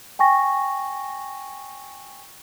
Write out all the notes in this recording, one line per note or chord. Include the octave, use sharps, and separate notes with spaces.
G5 G#5 C#6 A#6